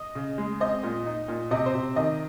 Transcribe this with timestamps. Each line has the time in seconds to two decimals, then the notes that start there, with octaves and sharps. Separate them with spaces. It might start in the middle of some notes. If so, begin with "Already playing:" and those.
Already playing: D#5
0.15 C#3
0.38 G#3
0.60 C4 D#5
0.83 A#2
1.06 D#4
1.28 A#2
1.51 C3 D#5
1.66 C5
1.74 C3
1.96 D#3 D#5